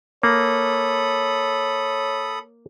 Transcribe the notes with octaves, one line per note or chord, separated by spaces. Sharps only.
A#3 A4 C#5 B5 D#6